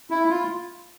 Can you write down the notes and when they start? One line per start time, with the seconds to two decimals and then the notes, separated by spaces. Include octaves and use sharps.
0.10 E4
0.30 F4